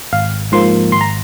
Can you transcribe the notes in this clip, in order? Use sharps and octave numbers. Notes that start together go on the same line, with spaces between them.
G#1 F5
G#2 F3 A#3 C6
G#1 C6
A#5